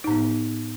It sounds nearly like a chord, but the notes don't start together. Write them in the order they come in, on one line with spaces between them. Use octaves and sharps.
D#4 A2 B3